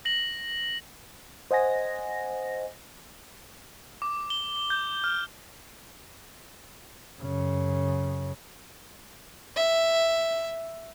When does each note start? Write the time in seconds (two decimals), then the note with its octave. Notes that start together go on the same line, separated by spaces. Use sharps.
0.05 A#6 F#7
1.51 C5 D#5 F#5 G#5 A#6
4.02 D6
4.30 G7
4.70 G6
5.04 F6
7.21 F#2 C#3
9.56 E5